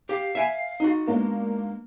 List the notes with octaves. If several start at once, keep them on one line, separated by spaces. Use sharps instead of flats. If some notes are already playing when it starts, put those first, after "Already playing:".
G4 F5
E5 G#5
D#4 F#4
G#3 A#3 B3 D4